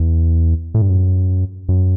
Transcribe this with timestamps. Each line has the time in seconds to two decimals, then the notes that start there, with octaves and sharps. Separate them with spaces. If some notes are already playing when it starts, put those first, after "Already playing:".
Already playing: E2
0.74 A2
0.82 G2
0.89 F#2
1.69 F#2